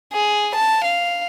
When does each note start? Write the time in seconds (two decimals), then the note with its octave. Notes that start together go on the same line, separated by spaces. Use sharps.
0.13 G#4
0.56 A5
0.85 F5